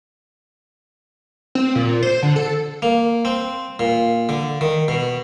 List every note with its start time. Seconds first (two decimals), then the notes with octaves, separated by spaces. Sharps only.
1.55 C4
1.75 A#2
2.03 C5
2.23 D3
2.36 A4
2.82 A#3
3.25 C4
3.79 A#2
4.29 D3
4.61 D#3
4.88 B2